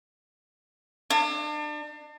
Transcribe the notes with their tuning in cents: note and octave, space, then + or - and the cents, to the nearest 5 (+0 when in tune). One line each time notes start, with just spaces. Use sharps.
D4 +35